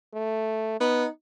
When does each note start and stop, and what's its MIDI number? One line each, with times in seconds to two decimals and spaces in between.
0.14 0.78 57
0.80 1.04 59
0.80 1.09 63